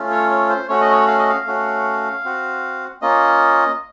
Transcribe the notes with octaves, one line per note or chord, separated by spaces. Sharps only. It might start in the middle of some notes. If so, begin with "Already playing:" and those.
Already playing: A3 C#4 F4
C#5
C#5
C5
A3 C#4 F#4 C#5
D#5
C#5
F5
D#5
F5
A3 C#4 F#4
C4 F#4
A#3 C#4 F4 D#5